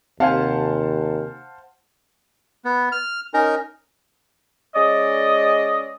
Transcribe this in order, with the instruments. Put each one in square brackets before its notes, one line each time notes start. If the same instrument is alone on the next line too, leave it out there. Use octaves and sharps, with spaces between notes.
[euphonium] D#2 [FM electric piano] C3 G#5 [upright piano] C5 F#5 A5 [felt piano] F5
[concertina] B3
F6
C#4 D#4 A#4 A#5
[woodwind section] G#3 C#4 D5 D#5